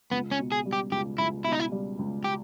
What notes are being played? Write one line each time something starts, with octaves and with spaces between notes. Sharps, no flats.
C#2 B3
C#4
B2
G#4
G3
G4
C#2 G4
C#2 E4
B2 E4
D#4
E4
G3
C#2
G4